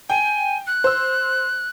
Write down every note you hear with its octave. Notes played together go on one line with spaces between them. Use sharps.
G5 G#5
F#6
C5 E6